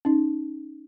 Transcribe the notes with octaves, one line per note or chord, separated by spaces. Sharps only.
C#4 D#4